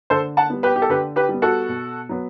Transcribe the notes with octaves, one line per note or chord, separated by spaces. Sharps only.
D3 A4 C5
F#5 A5
G3 B3
G4 B4
G4
A4
D3 G4 B4
G4 B4
G3 B3
F#4 A4
B2
F#3 B3